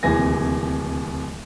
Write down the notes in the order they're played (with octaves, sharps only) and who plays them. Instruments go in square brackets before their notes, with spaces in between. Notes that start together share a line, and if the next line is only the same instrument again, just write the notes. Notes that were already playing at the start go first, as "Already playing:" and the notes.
[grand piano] D1 D#2 C3 E3 G#5 A#6